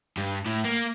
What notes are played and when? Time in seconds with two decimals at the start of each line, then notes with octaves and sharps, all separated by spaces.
0.17 G2
0.46 A2
0.65 A#3